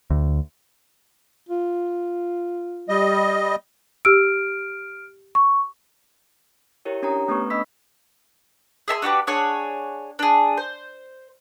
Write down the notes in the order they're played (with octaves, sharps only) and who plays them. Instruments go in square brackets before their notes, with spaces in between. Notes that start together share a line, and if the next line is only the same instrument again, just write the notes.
[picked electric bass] D2
[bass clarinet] F4
[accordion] G3 D#5
[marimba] G4 E6 [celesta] F6 D7
[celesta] C#6
[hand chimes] E4 G4 A#4 C#5
C#4 D4 G4 C#5 A#5
A3 B3 C#4 B4 C#6
D4 D#5 B5 E6 B6
[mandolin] G#4 E5 A5 C6
D4 F#4 G4 B4
D4 G#4 C#5 F#5
D4 G#4
C5